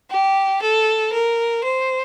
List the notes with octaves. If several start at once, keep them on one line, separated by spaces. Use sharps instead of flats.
G4
A4
A#4
C5